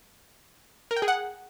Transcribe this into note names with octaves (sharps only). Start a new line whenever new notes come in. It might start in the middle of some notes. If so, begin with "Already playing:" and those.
A#4
G5
G#4
F#5